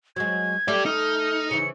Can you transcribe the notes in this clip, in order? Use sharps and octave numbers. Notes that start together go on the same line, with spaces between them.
F#3 G#3 G#6
A3 G4 D5
D#4 F6
C#3 E3 C#7